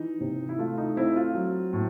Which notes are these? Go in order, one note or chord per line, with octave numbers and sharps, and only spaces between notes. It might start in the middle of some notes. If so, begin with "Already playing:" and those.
Already playing: E3 D#4
C3
E4
A3 F4
D#4
C4 E4
F4
F#3
A2